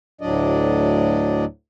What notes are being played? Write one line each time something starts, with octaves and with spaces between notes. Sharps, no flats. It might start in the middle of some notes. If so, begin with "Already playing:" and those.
D2 A2 F#3 D4 D5 D#5